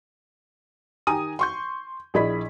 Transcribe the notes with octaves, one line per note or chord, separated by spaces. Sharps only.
D#3 G4 G#5 A#5 D#6 D#7
C6 C#6 G6
A#1 E4 G#4 D#5 B5 B6